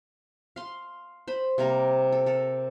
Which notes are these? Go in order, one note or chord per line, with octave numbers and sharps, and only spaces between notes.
F5 C6
C5 B5
C3 G3 A#3 A#4
A4
A4 A#4